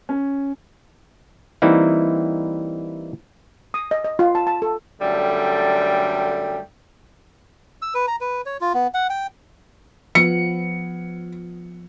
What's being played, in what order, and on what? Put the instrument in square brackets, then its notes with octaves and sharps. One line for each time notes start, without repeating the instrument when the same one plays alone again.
[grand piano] C#4
[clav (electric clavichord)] E3 G3 A#3 C4 D#4 E4
[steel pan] D#6
D#5
D#5
F4
A5
A5
A4
[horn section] F#2 D3 G3 A3 G5
[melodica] E6
B4
A#5
B4
C#5
F4
B3
F#5
G5
[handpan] F3 B3 [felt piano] C#7